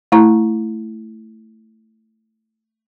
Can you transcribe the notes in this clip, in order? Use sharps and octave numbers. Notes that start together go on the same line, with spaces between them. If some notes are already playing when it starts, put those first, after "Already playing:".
A3 E4 A#5